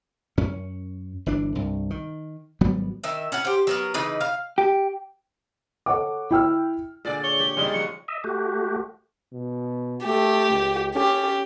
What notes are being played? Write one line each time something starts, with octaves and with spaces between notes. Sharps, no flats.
F#2 C#4
G1 E3 D4
C2 G2
D#3
G#1 F#3 G3 B3
D#3 E5
C#4 F#5
G4 C5
F#3 B3 A#4
C#3 E3 D#4 B4
F5
G4
A4 C#5 F#5 D6
E4 G5 E6 F6
A#2 D3 G#4 D5
C#5 G7
G4 G5
E2 C#3 G3 G#3 D#4
F3 F#3 C#7
D#5 E5
A3 F#4 G4
B2
A3 G4
C#2
C#4 G4